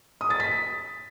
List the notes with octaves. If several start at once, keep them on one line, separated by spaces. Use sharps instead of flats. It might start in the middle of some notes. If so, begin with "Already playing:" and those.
D#6
A6
B6